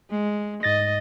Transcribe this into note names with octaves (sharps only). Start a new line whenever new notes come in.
G#3
G#2 D#5 A6 A#6